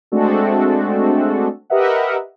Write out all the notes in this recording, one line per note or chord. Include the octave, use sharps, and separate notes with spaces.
G#3 A3 C4 D4 F#4 A4
G4 A#4 B4 D#5 E5 F#5